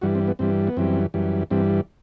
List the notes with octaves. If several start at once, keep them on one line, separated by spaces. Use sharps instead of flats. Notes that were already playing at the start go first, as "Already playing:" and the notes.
G2 E3 G3 F#4
C4
B3
G2 E3 G3 C4
B3
F#2 E3 G3 C4
F#2 E3 G3
G2 E3 G3 C4